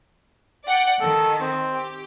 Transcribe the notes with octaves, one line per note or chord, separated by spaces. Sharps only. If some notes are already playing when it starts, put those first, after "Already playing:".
D5 F#5 G5
D#3 A4
C4
G4